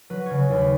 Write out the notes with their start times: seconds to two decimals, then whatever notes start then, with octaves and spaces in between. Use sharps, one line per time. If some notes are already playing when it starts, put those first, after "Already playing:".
0.10 F#3 B4
0.26 C#3 C#5
0.41 B4
0.50 D#2
0.56 B4